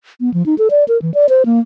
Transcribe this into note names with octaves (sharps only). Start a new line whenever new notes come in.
B3
F3
D#4
A4
D5
A#4
E3
D5
C5
A#3